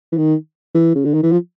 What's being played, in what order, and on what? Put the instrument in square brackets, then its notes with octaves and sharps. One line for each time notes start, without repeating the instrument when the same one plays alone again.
[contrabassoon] E3
D#3
E3
C#3
D3
D#3
E3
F3